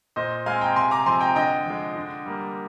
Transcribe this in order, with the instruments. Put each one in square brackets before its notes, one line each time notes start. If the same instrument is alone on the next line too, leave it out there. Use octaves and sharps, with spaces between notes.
[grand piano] A#2 C5 D#5
G#3 C4 F5 G#5
G5 A#5
C3 G#5 C6
A#5 D6
F3 G#3 C4 G#5 C6
G5 A#5
D3 D#5 G5
F3 G#3
D3
G3 A#3